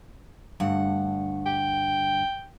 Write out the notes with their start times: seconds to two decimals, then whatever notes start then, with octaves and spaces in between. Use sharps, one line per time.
0.60 D2 G2 F#5
1.46 G5